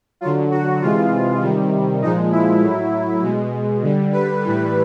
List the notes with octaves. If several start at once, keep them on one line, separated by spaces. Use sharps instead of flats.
D3 F#3 F4
F#4
C3 E3 G#3 F4
C3 D#3 G3
A#2 F3 G#3 D#4
E4
A2 F#3
B2 G#3
D3 G3
B4
A2 E3 G3